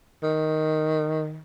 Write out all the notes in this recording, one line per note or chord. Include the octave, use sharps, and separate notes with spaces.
D#3